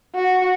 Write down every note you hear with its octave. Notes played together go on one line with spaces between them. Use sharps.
F#4